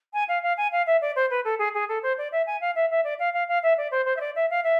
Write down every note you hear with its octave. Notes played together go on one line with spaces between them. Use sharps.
G#5
F5
F5
G#5
F5
E5
D5
C5
B4
A4
G#4
G#4
A4
C5
D5
E5
G#5
F5
E5
E5
D5
F5
F5
F5
E5
D5
C5
C5
E5
D5
E5
F5
E5